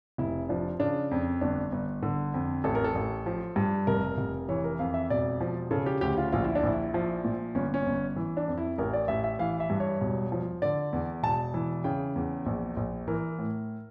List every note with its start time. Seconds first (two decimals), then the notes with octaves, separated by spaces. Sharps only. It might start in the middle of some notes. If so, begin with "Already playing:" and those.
0.18 F1 E4
0.49 F3 D4
0.80 C#3 D4
1.11 F2
1.41 G1 D4
1.72 G1
2.03 D3
2.34 F2
2.64 A1 A4
2.75 A#4
2.84 A4
2.95 A1
3.26 F3
3.56 G2
3.87 F1 A#4
4.17 F1
4.49 E3 C#5
4.64 A#4
4.79 F2 F5
4.94 E5
5.10 E1 D5
5.41 F3
5.71 C#3 A4
5.86 G4
6.01 D2 G4
6.17 F4
6.32 A#1 F4
6.44 E4
6.55 D4
6.63 A#1 E4
6.94 F3
7.24 A#2
7.55 G1 C#4
7.74 C#4
7.86 G1
8.16 E3
8.37 D4
8.48 F2
8.58 E4
8.78 A1 A#4
8.93 D5
9.08 A1 E5
9.24 E5
9.39 E3 F5
9.60 E5
9.70 G2
9.80 C#5
10.01 E1
10.32 F3
10.62 D3 D5
10.93 E2
11.23 E1 A5
11.54 E3
11.84 C#3 G5
12.16 E2
12.46 A#1
12.77 A#1
13.08 E3 A#4
13.39 A2